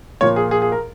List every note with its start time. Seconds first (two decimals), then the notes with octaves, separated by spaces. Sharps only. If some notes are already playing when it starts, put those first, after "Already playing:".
0.21 A#2 F3 A#3 C#5
0.36 G#4
0.51 G#4
0.62 G#4
0.72 A#4